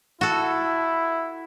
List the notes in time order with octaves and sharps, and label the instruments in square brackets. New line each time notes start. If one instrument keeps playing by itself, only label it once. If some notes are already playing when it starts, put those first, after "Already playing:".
[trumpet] E4 [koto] F#4 A4